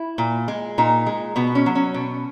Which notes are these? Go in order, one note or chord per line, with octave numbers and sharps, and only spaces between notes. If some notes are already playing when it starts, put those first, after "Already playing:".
Already playing: E4
A#2
G#3
A#2 D#4
G#3
B2 B3
C#4
F#3
C#4
B2